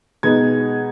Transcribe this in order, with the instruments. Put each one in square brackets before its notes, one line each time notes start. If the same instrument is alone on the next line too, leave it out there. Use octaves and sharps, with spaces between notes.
[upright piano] B2 G#3 B3 D#4 G#6